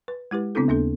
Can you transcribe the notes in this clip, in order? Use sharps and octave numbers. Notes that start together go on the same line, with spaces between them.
B4
G#3 E4 G4 B4
C#3 B3 C4 D4 E4 A4
D#2 A#3 D4 A4